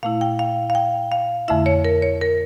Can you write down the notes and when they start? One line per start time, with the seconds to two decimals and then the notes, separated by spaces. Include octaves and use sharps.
0.03 A#2 A3 E4 F5
0.21 G5
0.39 F5
0.70 F5
0.75 G5
1.12 F5
1.48 F2 D3 A3 E4 E5
1.66 C#5
1.85 A#4
2.02 C#5
2.21 A#4